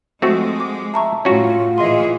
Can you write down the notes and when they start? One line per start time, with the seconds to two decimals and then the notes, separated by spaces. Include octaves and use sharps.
0.22 F3 G#3 A3 C4 F#4
0.60 D6
0.94 E5 A5 A#5 C#6
1.25 A2 C#4 F4 F#4
1.78 A#2 E3 G#4 D#5 E5 C6